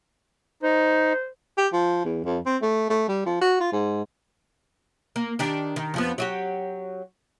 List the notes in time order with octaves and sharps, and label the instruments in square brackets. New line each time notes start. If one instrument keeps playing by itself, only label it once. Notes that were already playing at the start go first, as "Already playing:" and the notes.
[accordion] D#4 [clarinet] C5
[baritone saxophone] G4
F3
E2
F2
C4
A3
A3
G3
F3
F#4
F4
G#2
[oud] A#3
D#3 D4 G4
D#3
F2 F3 B3
F#3 F#4 G4